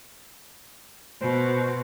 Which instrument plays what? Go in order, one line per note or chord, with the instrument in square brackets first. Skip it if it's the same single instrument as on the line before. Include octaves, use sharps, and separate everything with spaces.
[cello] B2 [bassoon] C5